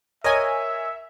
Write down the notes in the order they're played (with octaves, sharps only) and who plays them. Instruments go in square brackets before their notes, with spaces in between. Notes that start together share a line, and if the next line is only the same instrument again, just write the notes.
[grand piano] A#4 C#5 [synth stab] D#5 G#5 [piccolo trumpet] E5